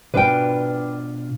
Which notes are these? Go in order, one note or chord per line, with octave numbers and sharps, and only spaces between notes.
B2 D4 F4 B4 G5